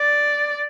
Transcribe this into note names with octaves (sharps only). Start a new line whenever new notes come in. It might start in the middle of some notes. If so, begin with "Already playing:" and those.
Already playing: D5